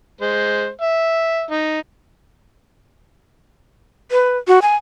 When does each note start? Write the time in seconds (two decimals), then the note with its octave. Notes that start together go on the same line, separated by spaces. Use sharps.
0.21 G#3 C5
0.81 E5
1.50 D#4
4.11 B4
4.48 F#4
4.62 G#5